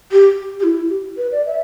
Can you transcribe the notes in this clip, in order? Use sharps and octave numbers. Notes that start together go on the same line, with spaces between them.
G4
G4
E4
G4
B4
D5
E5